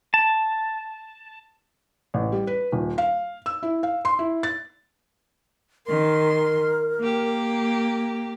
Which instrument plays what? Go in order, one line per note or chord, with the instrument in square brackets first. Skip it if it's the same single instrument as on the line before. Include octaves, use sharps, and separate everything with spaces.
[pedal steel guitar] A5
[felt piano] A1
G3
B4
D#1
F5
E6
E4
F5
C6
E4
A6
[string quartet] D#3 C6 [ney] A#4
[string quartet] A#3 G4